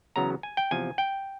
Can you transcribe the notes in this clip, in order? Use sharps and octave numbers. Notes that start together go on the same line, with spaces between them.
E2 C#3 F#3 B3 A#5
G#5
G5
E2 C3 F3 G#5
G5